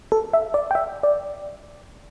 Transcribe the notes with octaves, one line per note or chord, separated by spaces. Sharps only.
A4
E5
D5
G5
E5
D5